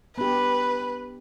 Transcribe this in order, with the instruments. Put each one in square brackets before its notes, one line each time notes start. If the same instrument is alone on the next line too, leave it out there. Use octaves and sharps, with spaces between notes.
[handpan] B3 D4 G4 [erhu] B4